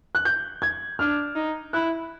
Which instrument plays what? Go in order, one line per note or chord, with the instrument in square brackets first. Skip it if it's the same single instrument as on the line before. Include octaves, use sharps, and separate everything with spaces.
[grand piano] F#6
G6
G#6
[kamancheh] D4 [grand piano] F6
[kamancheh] D#4
[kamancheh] E4 [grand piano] F#6